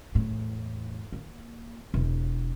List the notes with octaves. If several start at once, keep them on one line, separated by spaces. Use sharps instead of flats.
E2 A2
A#3
E1